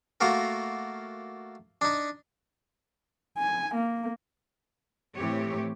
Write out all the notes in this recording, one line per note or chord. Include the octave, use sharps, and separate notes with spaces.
A3 A#3 F4 F#4 A#4
D4 D#4
G#5
A#3
A2 E3 C4 G4 C#5